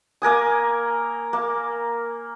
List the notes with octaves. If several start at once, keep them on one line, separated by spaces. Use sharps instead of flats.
A#3 A#4 G#5 D#6
A#3